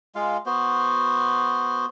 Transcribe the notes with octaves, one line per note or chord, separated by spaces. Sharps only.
G#3 F4 F5
B3 F#4 C5